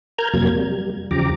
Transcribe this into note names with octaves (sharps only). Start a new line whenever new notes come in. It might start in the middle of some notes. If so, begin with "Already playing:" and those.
A#4 A#5 F6 G6 G#6
F2 C3 F#3 A#3 G#6
G3
E2 C#3 F3 G4 A#5 D6